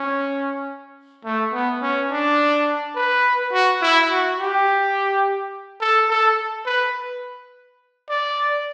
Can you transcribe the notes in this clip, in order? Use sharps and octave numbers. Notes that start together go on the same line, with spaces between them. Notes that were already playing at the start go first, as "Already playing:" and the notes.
Already playing: C#4
A3
B3
C#4
D4
B4
F#4
E4
F#4
G4
A4
A4
B4
D5